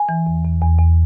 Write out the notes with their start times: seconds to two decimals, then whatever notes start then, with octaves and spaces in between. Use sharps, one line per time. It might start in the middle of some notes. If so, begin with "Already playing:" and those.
Already playing: G#5
0.09 E3
0.27 E2
0.44 E2
0.61 E2
0.79 E2